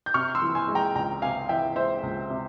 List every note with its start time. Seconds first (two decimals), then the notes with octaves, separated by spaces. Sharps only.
0.06 G6
0.14 C3 C#6 F6
0.35 C6 E6
0.42 E3
0.55 G#5 C6
0.68 G#3
0.75 G5 A#5
0.95 C#2 G5 A#5
1.22 C3 F5 G#5
1.49 E3 E5 G5
1.76 G#3 C5 E5
2.03 C#2
2.30 C3